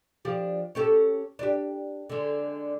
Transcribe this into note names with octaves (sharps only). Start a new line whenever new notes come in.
F3 D4 G4
C#4 G4 A4
D4 G4
D3 G#3